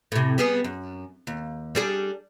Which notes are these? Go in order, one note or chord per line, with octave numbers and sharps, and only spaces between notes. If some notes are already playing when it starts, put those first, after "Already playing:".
A2 C3
G3 B3 G#4
F#2
D#2
G3 D4 G#4